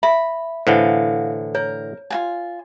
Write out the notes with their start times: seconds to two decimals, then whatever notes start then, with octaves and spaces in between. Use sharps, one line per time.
0.03 E5 B5
0.67 A2 D3 E3 F#4 C5 F5
1.55 A#4 C#5
2.10 F4 F#4 G#5